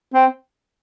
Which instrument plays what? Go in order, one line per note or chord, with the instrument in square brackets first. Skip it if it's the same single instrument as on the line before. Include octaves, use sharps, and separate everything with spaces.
[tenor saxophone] C4